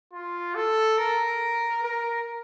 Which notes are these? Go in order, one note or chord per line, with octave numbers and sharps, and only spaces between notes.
F4
A4
A#4
A#4